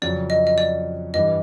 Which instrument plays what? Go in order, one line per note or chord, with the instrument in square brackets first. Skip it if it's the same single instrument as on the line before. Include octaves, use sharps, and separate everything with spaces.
[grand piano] F2 C#3 F#3 [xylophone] D5
[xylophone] D#5
D#5
D5
[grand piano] G2 E3 G3 [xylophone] D#5